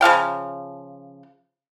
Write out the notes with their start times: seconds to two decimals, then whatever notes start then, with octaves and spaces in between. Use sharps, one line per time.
0.01 C#3 F3 F5 G5